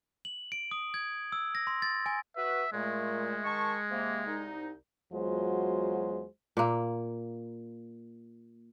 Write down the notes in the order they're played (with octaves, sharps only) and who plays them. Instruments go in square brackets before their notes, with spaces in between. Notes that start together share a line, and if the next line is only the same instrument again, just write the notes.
[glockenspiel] F#7
D7
D#6
G#6
E6
A#6
C6
A6
G#5
[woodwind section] F#4 B4 [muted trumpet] E5
[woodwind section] A#2 A3 [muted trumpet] G#3
[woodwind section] D#3 A5 C#6
C3 A#3
C2 D#4
[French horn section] E2 F#3 G#3 F4 F#4 C5
[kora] A#2 A#3